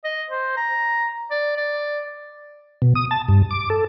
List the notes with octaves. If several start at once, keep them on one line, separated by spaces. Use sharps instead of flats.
D#5
C5
A#5
D5
D5
B2
D#6
A5
G2
D6
A4